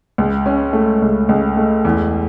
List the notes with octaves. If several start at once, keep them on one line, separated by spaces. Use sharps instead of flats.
C#2
C#4
A3
C#2
C#2
A3
E2